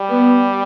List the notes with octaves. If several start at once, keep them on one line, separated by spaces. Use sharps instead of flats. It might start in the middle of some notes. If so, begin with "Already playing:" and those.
Already playing: G3
B3